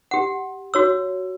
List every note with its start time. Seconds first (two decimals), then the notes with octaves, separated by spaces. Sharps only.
0.11 G4 F#5
0.74 F#4 C#5 E6